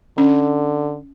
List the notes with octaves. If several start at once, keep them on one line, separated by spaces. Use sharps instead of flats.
D3 C#4